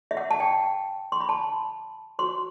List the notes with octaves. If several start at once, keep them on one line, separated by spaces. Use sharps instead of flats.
E5
F#5
A5
G5
C6
B5
A5
F#4 C5 C6